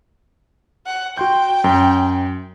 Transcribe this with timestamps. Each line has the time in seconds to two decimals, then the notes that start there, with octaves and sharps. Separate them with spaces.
0.86 F#5
1.17 F#4 G5 C6 G6
1.64 F#2